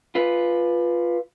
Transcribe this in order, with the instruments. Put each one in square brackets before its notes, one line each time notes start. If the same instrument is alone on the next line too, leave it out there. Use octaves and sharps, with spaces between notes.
[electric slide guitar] F4 B4